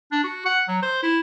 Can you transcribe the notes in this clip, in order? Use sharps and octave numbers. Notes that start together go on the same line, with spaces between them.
D4
F#4
F#5
F#3
C5
E4